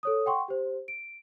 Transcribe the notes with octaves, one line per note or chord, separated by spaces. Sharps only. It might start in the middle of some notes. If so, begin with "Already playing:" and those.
A4 C#5 D#6
F#5 G5 C6 C#6
G4 C5
D7